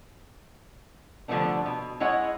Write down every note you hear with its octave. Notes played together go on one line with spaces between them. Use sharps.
D3 F3 G3 A3 B3 D4
B2
G#3 E4 C#5 D#5 F#5